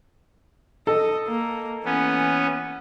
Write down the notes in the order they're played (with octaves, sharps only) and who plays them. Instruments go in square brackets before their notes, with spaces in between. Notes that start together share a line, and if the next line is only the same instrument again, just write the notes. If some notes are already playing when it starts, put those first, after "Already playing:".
[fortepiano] A4 [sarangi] D#5
[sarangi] A#3
[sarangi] E3 [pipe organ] B3 C#4